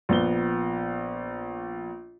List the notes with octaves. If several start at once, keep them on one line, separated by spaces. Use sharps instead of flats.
A#1 B3 G7